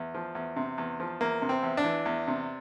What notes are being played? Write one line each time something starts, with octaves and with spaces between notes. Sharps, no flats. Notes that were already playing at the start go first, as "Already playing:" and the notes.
Already playing: E2
F3
E2
C3
E2
F3
E2 A#3
C3
C4
E2
D4
E3
E2
C3